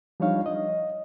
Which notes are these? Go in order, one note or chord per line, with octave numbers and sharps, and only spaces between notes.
F3 G3 D4 D#4 C#5 F5
D#5